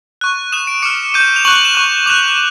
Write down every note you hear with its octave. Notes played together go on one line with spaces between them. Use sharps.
C#6 F#6
D#6 F#6 E7
D7
D6 F6 C#7
D6 G6 D#7
F7
C#6 F#6 F#7
F#7
E7
C#6 F#6
D6 F#6 F7